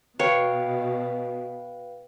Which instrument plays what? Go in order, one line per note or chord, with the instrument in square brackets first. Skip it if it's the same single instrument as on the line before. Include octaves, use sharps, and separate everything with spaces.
[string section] B2 [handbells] B4 F5 G5 [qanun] C#5